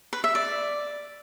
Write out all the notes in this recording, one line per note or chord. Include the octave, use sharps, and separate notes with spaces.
B4
E5
D5